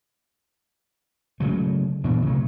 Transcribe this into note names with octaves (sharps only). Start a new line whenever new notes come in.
C#3 F#3 G#3 A3
A#2 E3 B3 D4
A1 C3 F#3 A3